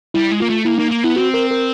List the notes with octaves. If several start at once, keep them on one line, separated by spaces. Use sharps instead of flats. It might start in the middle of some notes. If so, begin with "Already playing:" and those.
G3 E4
G#3
A#3 F4
A3
A#3 E4
A#3 D#4
A#3
B3 E4
C4 F#4
A#4
A#4